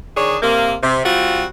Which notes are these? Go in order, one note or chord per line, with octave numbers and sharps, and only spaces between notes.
D#3 D4 G#4 C#5
C3 A#3
C3
G3 C4 F4 F#4